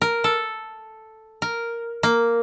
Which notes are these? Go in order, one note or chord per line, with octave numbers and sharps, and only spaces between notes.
A#4
A4
A#4
A#3